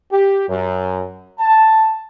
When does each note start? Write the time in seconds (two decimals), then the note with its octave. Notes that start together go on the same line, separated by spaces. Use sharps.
0.12 G4
0.49 F#2
1.39 A5